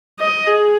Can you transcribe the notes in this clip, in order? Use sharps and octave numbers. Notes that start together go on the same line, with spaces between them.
D#5
G#4